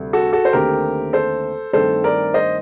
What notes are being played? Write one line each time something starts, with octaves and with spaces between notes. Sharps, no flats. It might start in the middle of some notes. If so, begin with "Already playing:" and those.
Already playing: D2 C3 G3
F#4 A4
F#4 A4
C5
D#2 D3 A3 C4 G4 A#4
A4 C5
G2 D#3 A3 C4 A4 C5
A#4 D5
C5 D#5